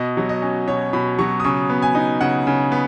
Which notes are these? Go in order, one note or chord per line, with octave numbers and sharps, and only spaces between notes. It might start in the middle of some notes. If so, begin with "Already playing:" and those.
Already playing: B2 D#5
F#3
D#5
C#4
B2 C#5
B2 B5
F#3 C#6
D#6
C#3 C#6
B3
G#5
D#4
C#3 F#5
C#3
B3